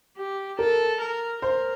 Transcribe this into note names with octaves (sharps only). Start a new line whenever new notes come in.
G4
A4 A#4
A#4
A#4 C5